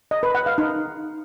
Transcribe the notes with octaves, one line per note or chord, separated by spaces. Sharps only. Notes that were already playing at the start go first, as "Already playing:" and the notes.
D#5
B4
F#5
F5
D#4